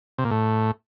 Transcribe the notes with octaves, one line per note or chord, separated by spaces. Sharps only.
C3
A#2
A2